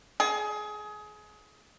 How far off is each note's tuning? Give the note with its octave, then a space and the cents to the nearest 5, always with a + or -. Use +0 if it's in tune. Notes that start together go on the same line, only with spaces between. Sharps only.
G#4 +25